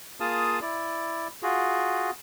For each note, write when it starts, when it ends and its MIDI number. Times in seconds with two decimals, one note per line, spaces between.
0.20 0.60 58
0.20 0.60 65
0.20 0.60 68
0.20 0.60 77
0.20 0.60 81
0.20 0.60 87
0.62 1.28 64
0.62 1.28 74
1.43 2.11 65
1.43 2.11 66
1.43 2.11 68